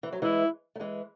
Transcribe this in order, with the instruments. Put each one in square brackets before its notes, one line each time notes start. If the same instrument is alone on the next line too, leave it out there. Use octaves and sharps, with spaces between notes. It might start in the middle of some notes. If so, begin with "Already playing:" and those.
[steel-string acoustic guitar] E3
F#3
[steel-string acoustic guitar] E3 G#3 [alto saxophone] E4
[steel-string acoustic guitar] A3
E3 G#3